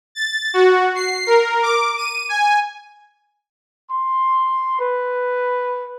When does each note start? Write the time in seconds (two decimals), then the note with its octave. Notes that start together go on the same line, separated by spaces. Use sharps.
0.15 A6
0.54 F#4
0.95 C7
1.27 A#4
1.63 D6
1.97 D#7
2.29 G#5
3.90 C6
4.79 B4